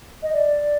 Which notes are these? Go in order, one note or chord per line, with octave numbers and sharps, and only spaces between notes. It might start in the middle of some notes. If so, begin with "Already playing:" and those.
D#5
D5